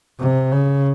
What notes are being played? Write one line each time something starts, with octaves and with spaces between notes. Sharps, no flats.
C3
C#3